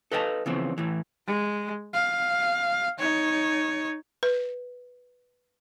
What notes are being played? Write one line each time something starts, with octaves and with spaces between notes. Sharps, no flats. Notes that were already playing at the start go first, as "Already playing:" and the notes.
A4 B4 D#5 F5 F#5 A5
C#3 E3 F3 B3 C4
A2 E3
G#3
F5
D#4 C#5
B4